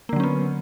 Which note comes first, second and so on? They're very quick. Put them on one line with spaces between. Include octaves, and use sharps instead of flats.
A#3 D3 F#3 C#4 B3